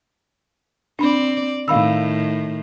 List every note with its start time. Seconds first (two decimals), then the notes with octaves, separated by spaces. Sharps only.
0.99 C4 D4 D5 B5
1.68 A2 D#3 F5 B5 E6